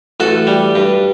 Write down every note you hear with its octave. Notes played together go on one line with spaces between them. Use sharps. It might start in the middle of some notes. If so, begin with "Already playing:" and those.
A1 F#4 A4
G3
G2